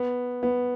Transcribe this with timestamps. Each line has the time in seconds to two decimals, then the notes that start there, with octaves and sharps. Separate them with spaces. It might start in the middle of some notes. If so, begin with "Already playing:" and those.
Already playing: B3
0.43 B3